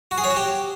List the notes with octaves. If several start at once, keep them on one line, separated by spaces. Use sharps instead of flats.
F#4
G#4
C#5
F#4
G4